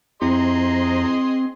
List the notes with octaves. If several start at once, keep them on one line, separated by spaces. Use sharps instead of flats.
F2 C4 E4 G#4 C5 D#5 A#5 C6